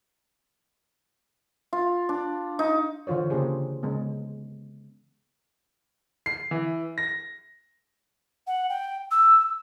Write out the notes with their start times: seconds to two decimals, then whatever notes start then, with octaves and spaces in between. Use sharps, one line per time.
1.73 F4
2.09 D4
2.59 D#4
3.07 D3 E3 F4 C5 C#5
3.30 C#3 A#3 D4 G4 G#4 C5
3.83 C#3 G#3 B3
6.26 C7
6.51 E3
6.98 A#6
8.47 F#5
8.69 G5
9.11 E6